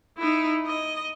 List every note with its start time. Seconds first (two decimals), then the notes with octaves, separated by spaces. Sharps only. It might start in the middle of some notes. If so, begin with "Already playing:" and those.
0.18 D#4 E4
0.67 D#5